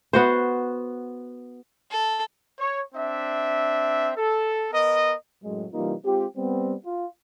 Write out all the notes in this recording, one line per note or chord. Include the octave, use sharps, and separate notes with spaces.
B3 F#4 C5
A4
C#5
C4 D4 E5
A4
B3 A#4 D#5
F#2 A2 F#3 G#3
C3 E3 G3 A#3 D#4 F4
G#3 C4 F4 G4
G3 B3 C4
F4